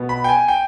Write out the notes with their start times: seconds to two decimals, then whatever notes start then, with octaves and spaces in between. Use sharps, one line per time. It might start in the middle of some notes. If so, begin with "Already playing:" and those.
Already playing: B2 B3
0.09 B5
0.24 G5
0.29 G#5
0.48 G5